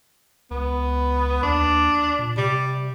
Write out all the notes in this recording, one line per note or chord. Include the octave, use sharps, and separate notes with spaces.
C#2 B3
D#2 D4
A#2
C3 G3